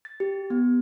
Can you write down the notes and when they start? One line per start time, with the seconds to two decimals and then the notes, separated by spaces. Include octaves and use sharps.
0.05 A6
0.20 G4
0.50 B3